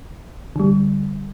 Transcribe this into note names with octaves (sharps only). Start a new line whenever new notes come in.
D3 G3